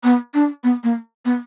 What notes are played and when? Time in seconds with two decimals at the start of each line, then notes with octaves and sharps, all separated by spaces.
0.04 B3
0.34 D4
0.64 B3
0.84 A#3
1.25 B3